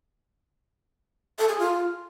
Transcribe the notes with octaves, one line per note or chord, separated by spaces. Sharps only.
A4
G#4
F4